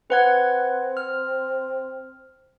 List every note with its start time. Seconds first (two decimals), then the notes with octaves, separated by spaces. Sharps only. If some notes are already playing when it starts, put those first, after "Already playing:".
0.10 C4 B4 F#5 G#6
0.97 F6